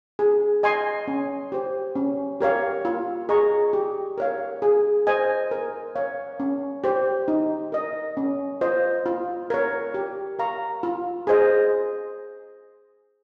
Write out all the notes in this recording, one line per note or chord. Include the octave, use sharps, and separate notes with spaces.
G#4
D#5 G#5 C6
C#4
G4 C5
C#4
G4 A#4 C#5 F5
F4
G#4 D#5 A#5 C#6
G4
A#4 C#5 F5
G#4
C5 D#5 G#5
A#4
C#5 F5
C#4
G4 C5
D#4
A#4 D#5
C#4
F4 C5 D#5
F4
A#4 C#5
G4
A#4 F5 A#5 C#6
F4
G#4 C5 D#5